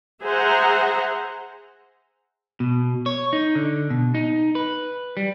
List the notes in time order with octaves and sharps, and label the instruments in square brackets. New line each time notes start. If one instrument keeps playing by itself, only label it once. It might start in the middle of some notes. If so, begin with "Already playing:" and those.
[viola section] G#4 C5 E5 F#5 A#5
[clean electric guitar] B2
C#5
D#4
D3
B2
D#4
B4
G3